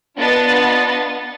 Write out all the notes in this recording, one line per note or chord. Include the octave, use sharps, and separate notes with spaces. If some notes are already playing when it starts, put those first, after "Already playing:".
B3 D4 F4 D#5 A6